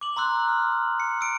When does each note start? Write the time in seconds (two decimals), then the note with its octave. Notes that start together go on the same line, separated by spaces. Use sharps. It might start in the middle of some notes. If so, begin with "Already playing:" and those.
0.01 D6 F#7
0.16 A#5 C6 E6 F#6
0.48 F6
1.00 C#7
1.21 E6 D7